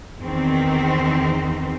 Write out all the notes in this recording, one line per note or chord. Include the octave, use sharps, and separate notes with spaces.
E2 D#3 C4